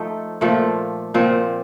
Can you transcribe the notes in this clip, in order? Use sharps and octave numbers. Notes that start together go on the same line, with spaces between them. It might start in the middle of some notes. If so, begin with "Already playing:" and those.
Already playing: F3 A3 D#4
A#2 F3 A3
A#2 F3 C4